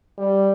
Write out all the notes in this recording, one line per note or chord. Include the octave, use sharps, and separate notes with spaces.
G3